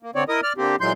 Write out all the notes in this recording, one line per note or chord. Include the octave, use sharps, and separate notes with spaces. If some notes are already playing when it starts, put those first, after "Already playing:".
A#3
D3 C4 C#5 D5
E4 A#4 D#5 D#6
D5 F6
D3 A#3 C4 G4
A#2 E3 F#3 G#3 C6 G6